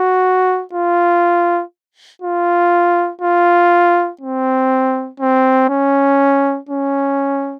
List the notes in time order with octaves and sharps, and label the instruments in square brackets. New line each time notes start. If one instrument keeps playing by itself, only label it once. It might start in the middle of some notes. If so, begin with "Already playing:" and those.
Already playing: [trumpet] F#4
F4
F4
F4
C4
C4
C#4
C#4